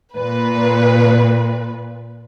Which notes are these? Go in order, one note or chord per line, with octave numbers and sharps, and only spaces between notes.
A#2 B4